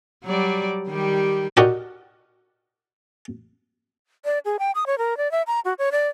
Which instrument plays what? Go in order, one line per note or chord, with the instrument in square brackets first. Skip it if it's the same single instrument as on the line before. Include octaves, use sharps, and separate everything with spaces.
[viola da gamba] F#3 G3 D5
D#3 G3 G4
[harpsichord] D#4 F#4 G4 A#4 D5
[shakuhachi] D5
G#4
G5
D#6
C#5
A#4
D5
E5
A#5
F#4
C#5
D5